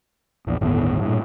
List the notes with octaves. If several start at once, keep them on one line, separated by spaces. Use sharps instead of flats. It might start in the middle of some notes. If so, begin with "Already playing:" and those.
A#1 E2
G1 D#2 A2 B3
G2 A#2